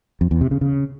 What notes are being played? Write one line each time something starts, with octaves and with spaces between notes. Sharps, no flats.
F2
E2
C3
C#3
C#3